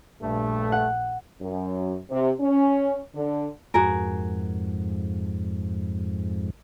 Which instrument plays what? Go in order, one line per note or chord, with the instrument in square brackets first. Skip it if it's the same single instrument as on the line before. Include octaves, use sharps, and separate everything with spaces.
[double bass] A#1 [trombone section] G2 A3
[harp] F#5
[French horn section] F#2
C3
C#4
D3
[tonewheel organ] F2 G#2 [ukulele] F#4 G#4 A#4